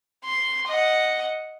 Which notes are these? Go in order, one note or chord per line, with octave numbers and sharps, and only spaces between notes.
C6
D#5 F#5